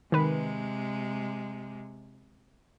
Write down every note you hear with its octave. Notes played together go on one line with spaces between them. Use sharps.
C3 D#3 G#3 B4